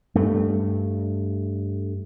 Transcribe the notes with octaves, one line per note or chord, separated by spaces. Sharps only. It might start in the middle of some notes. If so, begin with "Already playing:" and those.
G2 A3